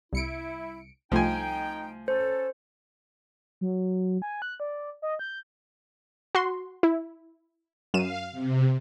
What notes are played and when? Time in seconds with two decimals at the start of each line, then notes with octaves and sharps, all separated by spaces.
0.13 C2 E4 C#7 D7
1.12 C2 F3 A3 D#4 G5 G#5
2.08 C#4 A4 C5
3.61 F#3
4.22 G#5
4.42 F#6
4.60 D5
5.02 D#5
5.19 G6
6.35 F#4 C6
6.83 E4
7.94 F#2 F5 D#7 E7
8.32 C3